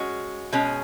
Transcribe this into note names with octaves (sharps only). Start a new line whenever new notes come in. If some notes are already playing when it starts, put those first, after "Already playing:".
Already playing: G#3 C#4 F#4
B2 G#3 C#4